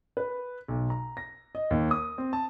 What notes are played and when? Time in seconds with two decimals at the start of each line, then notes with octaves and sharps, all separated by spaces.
0.17 B4
0.68 B1
0.90 A#5
1.17 A#6
1.55 D#5
1.71 D#2
1.91 D#6
2.18 C4
2.33 A5